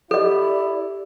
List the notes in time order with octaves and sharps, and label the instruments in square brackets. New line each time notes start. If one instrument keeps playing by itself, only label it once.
[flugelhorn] E4 [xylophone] G4 [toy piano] A4 D#5 [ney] D5